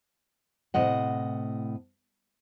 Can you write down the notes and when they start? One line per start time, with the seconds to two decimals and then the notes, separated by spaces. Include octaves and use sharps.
0.74 A2 C3 D#5 F#5